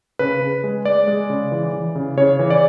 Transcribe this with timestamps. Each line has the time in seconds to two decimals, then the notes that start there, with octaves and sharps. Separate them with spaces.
0.19 C#3 B4
0.42 C#3
0.64 G#3
0.85 G#3 D5
1.07 G#3
1.30 C#3
1.52 E3
1.73 E3
1.95 C#3
2.17 C#3 C#5
2.39 E3
2.50 D5